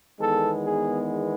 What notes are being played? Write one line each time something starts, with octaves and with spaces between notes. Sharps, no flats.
E2 D#3 G#3 B3 A4
G#4